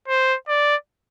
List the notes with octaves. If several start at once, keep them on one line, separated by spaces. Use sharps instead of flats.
C5
D5